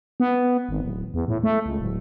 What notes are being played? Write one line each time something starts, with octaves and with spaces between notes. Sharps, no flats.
B3
G#1
D1
E2
A2
A3
C#2
D1